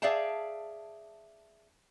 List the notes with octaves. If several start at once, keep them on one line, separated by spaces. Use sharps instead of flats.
G#4 D5 E5 F5 G5 A5